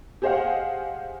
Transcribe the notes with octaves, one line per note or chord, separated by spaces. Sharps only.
G4 G#4 C5 D#5 F5 F#5